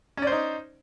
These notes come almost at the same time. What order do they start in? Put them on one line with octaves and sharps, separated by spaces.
C#4 D5 C5 D#4